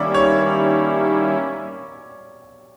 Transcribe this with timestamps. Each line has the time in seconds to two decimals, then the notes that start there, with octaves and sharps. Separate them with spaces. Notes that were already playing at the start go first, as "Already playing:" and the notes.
Already playing: D#3 G3 A#3 C#4 E4 D5
0.14 C#5